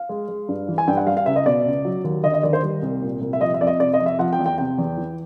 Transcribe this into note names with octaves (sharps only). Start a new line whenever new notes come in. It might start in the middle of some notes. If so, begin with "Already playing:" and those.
Already playing: F5
G#3
G#3
G2
E3
G#5
G2 G5
F#5
G3 F5
F5
C#2 E5
D#5
B2 D5
C#2
F#3
D#2
D3 D#5
D#5
D#2 D5
C5
G3
C2
A#2
C2
E5
F3 D#5
E5
F2 D5
D#5
C3 D5
D#5
F2
E5
F3 F#5
G5
E2
G5
C3 G5
E2
E3